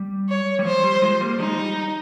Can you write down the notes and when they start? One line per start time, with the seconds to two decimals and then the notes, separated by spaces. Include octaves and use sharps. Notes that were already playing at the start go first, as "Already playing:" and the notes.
Already playing: G3
0.29 C#5
0.59 G3
0.65 F3 C5
0.84 G3
1.02 F3 G#3
1.21 G3 A#3
1.39 F3 G#3 D#4
1.53 F3
1.57 G3